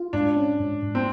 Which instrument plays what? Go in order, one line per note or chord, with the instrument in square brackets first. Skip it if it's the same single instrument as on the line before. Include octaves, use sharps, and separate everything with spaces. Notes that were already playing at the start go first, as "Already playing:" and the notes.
Already playing: [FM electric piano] F4
[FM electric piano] G#2 [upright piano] D4
[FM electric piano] C#4
G#2
G#2
[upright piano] C4